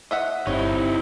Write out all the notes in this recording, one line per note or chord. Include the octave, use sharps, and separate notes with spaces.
D#5 E5 F#5
G1 C3 D#4 E4 C#5